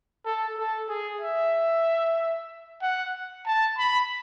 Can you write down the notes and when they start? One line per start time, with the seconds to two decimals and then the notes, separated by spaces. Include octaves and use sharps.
0.25 A4
0.57 A4
0.89 G#4
1.21 E5
2.82 F#5
3.46 A5
3.78 B5